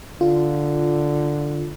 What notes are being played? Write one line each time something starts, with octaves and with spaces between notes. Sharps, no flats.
D3 F4